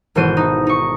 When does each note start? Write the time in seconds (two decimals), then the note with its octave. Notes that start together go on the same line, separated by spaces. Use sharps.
0.15 G#1 B2 E3 A4 C5 D#7
0.37 D#4
0.67 D#4 C#6